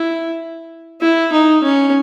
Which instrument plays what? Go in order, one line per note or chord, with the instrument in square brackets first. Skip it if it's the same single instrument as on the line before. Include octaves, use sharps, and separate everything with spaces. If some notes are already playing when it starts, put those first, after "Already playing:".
Already playing: [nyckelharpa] E4
E4
D#4
C#4